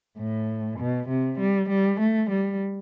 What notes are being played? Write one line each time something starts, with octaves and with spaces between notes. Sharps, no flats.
A2
B2
C3
G3
G3
A3
G3